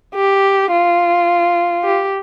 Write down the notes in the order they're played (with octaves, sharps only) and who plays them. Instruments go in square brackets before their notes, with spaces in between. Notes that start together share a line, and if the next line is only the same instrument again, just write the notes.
[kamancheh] G4
F4
G4